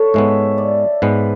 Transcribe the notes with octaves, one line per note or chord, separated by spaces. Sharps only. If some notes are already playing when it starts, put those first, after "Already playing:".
Already playing: A4 C#5
G#2 G#3 B3 E5
D5
G#2 G#3 B3 B4